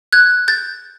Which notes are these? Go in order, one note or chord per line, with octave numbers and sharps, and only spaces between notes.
F#6 G#6
G6 A6